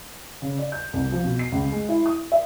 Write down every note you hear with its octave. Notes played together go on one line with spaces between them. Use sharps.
C#3
D5
G6
C2
F3
B2
C7
C#2
G#3
E4
D#6
E5